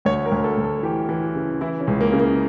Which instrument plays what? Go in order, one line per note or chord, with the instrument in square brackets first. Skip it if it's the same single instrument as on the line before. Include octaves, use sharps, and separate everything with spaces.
[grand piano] D2 C#5
A#4
D2
A4
D2
A4
E3 G4
E3
C#3
E3 E4
C#4
C#2
A#3
C#3
A#3